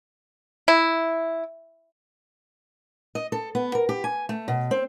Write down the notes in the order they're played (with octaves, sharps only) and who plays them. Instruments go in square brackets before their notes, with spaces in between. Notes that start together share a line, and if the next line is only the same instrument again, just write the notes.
[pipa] E4
[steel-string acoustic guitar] D#5
A4
B3
A#4
G4
G#5
A3
B2
C4